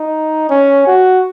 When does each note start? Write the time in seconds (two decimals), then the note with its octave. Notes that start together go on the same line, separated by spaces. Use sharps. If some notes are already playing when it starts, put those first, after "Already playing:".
Already playing: D#4
0.50 C#4
0.87 F#4